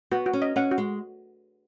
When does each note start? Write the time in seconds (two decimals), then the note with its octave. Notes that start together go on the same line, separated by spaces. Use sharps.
0.11 B3 F#4
0.26 F#4
0.33 C#4
0.42 D#5
0.56 C#4 F#5
0.71 F#4
0.78 G#3